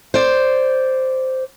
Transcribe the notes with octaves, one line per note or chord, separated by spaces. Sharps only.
C5 D5